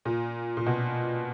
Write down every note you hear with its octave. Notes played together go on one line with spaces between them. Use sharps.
A#2
A#2
B2